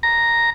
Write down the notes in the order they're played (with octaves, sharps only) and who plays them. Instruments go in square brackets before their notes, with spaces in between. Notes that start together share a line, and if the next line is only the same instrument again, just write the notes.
[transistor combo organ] A#5